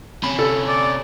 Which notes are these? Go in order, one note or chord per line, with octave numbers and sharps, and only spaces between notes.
C3 C#4 B5
A4
D5